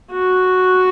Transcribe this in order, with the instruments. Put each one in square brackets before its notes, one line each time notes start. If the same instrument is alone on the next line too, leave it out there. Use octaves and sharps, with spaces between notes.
[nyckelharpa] F#4